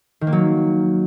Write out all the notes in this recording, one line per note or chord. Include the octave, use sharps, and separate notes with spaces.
D#3
A#3
F#3